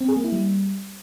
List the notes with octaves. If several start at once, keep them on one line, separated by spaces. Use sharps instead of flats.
C4
G#4
A#3
E4
G3